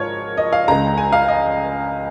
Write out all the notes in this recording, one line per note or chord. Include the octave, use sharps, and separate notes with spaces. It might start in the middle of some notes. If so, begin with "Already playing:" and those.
Already playing: G#1 G#2 F3 F4 A#4 C#5
D#5
F5
C#2 C#3 G#3 A#5
G#5
F5
D#5